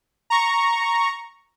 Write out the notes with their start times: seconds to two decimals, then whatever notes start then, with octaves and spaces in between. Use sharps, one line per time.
0.30 A#5 C#6